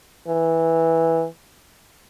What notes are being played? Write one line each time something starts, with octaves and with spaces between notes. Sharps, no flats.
E3